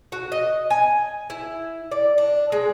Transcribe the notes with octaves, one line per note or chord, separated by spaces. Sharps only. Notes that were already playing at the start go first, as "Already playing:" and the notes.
F#4
D#5
G#5
E4
D5
D4
G#3